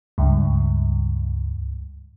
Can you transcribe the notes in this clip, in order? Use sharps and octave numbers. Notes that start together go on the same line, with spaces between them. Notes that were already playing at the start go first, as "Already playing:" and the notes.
C#2 G2